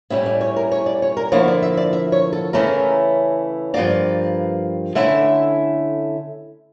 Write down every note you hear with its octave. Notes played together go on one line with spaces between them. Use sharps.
A2 G3 C#4 E4 E5
D5
C#5
A#4
C#5
D5
C#5
A#4
D3 F3 A#3 E4 C#5
D5
E5
D5
E5
C#5
A4
C#3 E3 A3 C#4 E4 A#4
G2 F3 A#3 D5
D3 A3 C#4 E4 E5